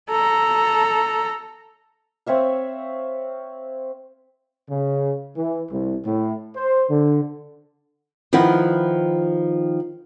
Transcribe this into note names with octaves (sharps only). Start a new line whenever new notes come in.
A4 A#5
C4 C#5 E5 F5
C#3
E3
C2
A2
C5
D3
D#3 F3 E4 B4 F#5